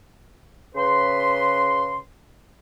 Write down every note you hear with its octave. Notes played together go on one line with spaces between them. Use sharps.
C#3 B4 C6